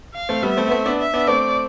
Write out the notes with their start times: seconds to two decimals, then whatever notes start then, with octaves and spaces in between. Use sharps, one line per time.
0.14 F5
0.29 A3 C4
0.43 G3 B3 E5
0.57 A3 C4
0.67 B3
0.71 A3 C4
0.86 B3 D4
0.99 E5
1.14 B3 D4
1.28 A3 C4 D5